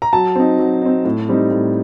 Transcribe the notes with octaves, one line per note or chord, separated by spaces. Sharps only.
A#5
F#3 A5
C4 D#4
F#3
C4 D#4
A2
G3 C4 D#4
A2